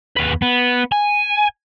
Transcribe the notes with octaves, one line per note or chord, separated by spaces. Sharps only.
D#2 B4
B3
G#5